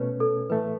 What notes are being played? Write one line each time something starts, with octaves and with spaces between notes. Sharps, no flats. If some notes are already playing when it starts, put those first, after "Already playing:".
Already playing: B2 A3 C#4 B4 C#5
A4
A2 E3 A3 B4